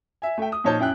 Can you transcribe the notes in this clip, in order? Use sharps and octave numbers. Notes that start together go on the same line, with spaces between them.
E5 G#5
A3 E5 G5
D#6
A#2 F3 D#4 C#5 A5 G6
F#2 E4 G5 F#6